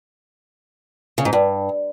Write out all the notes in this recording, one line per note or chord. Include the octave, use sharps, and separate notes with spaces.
C#3
G#2
G2